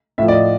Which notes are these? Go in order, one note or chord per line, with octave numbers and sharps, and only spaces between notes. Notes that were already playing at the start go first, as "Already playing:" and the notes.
A2 F3 E5
D5
D#5